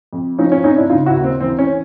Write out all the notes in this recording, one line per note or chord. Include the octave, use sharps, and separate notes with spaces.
F2
F3 C#4 D#4
C#4
F2 C#4 D#4
D4 E4
C#3 D#4 F4
E4 F#4
D#2
C4
E3 C4
C#4